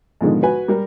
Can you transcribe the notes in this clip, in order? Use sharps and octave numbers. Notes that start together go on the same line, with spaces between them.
G#2 B2 D3 D#3 F3 G#3
F#4 B4 G#5
G3 A#4